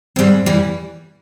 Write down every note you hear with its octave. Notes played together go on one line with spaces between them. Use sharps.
G#2 G3 C4
E3 G3